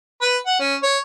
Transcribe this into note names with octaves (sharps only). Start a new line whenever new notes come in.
B4
F#5
C#4
C#5